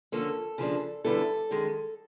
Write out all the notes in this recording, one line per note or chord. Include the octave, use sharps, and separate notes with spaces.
D3 F3 A#3 C#4 F4 A4
C#3 F3 A#3 D4
F#2 D3 G3 B3 E4 A4
F#2 D#3 G#3